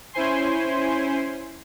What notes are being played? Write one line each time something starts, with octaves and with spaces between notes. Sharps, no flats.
C#4 E4 C5 G#5 C6